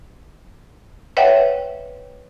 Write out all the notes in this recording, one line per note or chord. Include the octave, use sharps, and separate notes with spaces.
B4 C#5 D#5 E5 F#5 G5